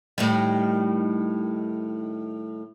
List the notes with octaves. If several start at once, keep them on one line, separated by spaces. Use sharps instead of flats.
A2 D#3 G3